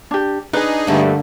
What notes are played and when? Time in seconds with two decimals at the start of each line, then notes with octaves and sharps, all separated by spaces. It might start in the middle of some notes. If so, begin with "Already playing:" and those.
0.11 D4 G4
0.53 D4 D#4 G#4 B4
0.87 G2 D3 A3 A#3